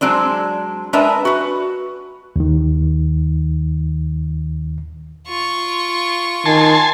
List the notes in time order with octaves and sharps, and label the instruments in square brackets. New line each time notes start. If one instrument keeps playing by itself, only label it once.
[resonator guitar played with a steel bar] F#3 G#3 C4 D4
G#3 D4 A#4 B4 D#5 E5
F#4 B4
[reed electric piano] D#2 D#3
[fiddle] F4 C#6
[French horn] D#3 [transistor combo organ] G#5 A5 C6